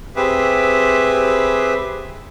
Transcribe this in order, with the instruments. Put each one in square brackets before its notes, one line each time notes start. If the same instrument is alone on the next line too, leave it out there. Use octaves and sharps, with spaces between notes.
[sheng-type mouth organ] C4 G4 G#4 B4 E5